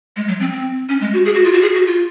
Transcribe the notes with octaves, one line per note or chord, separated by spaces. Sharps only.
G#3
F#3
C4
C4
C#4
G#3
F#4
G#4
F#4
F4
F#4
G#4
F#4
F4